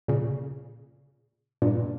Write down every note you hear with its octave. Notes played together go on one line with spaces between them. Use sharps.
A#2 C#3
G2 A#2